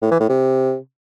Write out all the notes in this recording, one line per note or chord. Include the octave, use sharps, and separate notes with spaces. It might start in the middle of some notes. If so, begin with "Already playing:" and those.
A2
E3
A2
C3